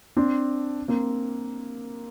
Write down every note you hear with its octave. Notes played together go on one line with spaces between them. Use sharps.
C4 D4
A#3 C4